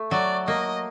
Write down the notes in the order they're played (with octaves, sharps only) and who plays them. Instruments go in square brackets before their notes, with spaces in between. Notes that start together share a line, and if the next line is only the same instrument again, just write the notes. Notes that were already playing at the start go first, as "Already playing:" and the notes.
Already playing: [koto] A3
[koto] F#3 [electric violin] D5
[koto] A#3 [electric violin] D#5